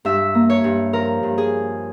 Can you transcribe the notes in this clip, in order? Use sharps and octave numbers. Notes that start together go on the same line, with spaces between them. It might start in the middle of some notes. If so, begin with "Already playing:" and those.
G2 E5
A#3
C#5
G2
F3 A#4
G2
G#4